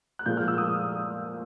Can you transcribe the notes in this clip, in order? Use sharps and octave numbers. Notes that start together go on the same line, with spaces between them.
F#6
A#2 F3 G#3 G6
F6
E6
D#6